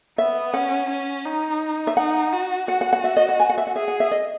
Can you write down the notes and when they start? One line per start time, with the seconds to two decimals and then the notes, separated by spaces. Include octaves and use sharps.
0.18 B3 E5
0.54 C#4 F#5
0.90 C#4
1.25 D#4
1.87 E5
1.97 D#4 F#5
2.33 F#4
2.68 F#4 F#5
2.81 F#5
2.93 F#5
3.04 E5
3.17 D#5
3.29 F#5
3.40 G#5
3.49 F#5
3.58 E5
3.67 F#5
3.76 G#4 E5
3.88 F#5
4.00 E5
4.11 D#5